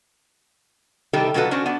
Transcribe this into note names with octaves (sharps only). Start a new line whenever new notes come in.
C3 D#3 G3 A3 G4 A4
B2 F#3 F4 F#4 A4 B4
C#4 D4 F#4 C5
B3 D4